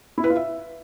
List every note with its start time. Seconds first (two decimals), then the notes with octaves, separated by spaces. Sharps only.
0.18 E4
0.24 B4
0.30 F4
0.36 E5